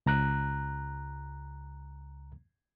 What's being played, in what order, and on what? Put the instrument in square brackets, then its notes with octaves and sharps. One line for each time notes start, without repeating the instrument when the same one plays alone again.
[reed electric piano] C#2 A#5 F#6